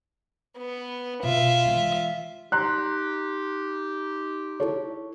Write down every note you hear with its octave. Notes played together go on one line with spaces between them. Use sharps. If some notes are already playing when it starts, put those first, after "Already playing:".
B3
B2 F4 E5
E3 G#3
D#4 G4 A#5 C6 F#6
E4 A4 C#5